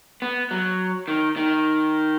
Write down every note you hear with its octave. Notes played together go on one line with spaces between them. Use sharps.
B3
F#3
D#3
D#3